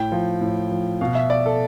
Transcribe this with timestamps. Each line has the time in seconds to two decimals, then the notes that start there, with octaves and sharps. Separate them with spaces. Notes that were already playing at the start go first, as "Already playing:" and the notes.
Already playing: A2 G5
0.12 F3
0.41 A2
0.71 F3
1.01 B2 F5
1.15 E5
1.30 D5
1.46 A4